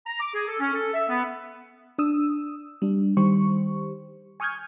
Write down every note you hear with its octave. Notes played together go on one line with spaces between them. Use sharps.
A#5
D6
G#4
A4
C#4
A4
E5
B3
D4 D#6 E6
G3 D4
D#3 G3 G4 C5 C#6
G#5 C#6 D#6 F6 G6 G#6